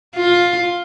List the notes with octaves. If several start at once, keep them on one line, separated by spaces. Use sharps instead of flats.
F4